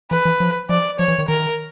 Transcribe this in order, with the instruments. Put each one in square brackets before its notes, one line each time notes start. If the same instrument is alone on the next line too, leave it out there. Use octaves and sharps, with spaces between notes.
[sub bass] E3 [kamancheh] B4
[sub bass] E3
F3
[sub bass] F3 [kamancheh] D5
[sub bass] F3 [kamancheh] C#5
[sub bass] E3
D#3
[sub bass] D#3 [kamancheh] A#4